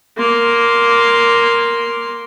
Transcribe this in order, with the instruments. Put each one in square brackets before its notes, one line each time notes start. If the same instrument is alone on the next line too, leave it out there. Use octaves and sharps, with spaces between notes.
[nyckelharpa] A#3 C6